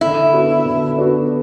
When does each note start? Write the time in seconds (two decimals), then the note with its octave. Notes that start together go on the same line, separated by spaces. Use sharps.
0.01 D3 E4
0.33 B3 D4 F#4
0.65 D3
0.97 B3 D4 F#4